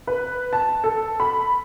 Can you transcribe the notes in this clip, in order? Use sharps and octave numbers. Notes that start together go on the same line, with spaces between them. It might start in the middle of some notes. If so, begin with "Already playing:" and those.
B4
A5
A4
B5